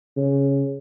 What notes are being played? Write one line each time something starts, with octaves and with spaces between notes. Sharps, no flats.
C#3